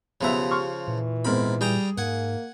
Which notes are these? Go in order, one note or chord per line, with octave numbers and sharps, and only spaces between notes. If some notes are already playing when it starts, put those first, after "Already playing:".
B1 C#3 F3 B3 G4 E5 A#5
C6 C#6 F6
A#2 E3
G#2 B2 C4 A#4 B5
G3 G#4 G5 A#5
G#2 A#3 F#5 G#5